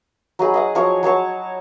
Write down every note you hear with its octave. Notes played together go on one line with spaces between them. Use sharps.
F#3 D#4 G#4 B5
D#5 F5 F#5
F3 F#3 C#5
F#3 C#5 A5 C#6